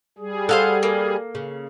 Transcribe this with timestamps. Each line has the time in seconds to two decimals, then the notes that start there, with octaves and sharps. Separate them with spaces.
0.18 G3 G#4
0.49 A4 C5 F5 F#5
0.83 A#3
1.35 C#3